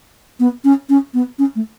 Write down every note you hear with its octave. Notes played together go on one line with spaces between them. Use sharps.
B3
C#4
C#4
B3
C#4
A3